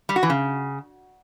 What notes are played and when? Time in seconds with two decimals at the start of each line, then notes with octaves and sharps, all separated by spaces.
0.09 G3
0.16 F#4
0.23 E3
0.30 C#3